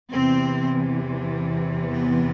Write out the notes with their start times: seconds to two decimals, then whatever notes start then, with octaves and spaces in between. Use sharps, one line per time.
0.12 E2 C3 E3 C4
1.91 B3